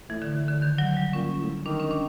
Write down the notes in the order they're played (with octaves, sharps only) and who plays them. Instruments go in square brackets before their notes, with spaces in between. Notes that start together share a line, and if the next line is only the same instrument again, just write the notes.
[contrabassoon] A2 [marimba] E3
[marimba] D3
D3
D#3
F#3
G3
[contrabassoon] A#2 [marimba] C#4
[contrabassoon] A2
[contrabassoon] D#3 [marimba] D4
[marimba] C#4
D4